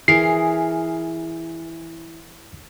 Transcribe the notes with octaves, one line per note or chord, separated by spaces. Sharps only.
E3 G#4 A#4 C7